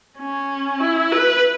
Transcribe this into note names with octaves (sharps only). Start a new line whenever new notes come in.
C#4
E4
B4